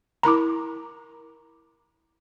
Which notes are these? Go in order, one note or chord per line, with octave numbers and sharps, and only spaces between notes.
E4 A#4 A#5 B5 D6